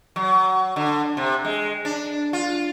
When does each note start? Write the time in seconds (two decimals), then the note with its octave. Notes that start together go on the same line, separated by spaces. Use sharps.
0.16 F#3
0.76 D3
1.17 C3
1.45 G#3
1.85 D4
2.33 F4